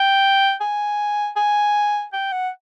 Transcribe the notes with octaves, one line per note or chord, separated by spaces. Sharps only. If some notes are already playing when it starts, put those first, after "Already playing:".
Already playing: G5
G#5
G#5
G5
F#5